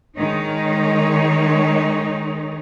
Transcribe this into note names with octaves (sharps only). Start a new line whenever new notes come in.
D#3 G#3 D#4 C#5